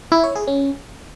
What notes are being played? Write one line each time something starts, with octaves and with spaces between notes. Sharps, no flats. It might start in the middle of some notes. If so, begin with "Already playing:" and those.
E4
C#5
G#4
C#4